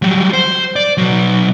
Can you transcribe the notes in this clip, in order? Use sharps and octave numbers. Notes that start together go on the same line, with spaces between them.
F#3 G3
C5
D5
B1 F#3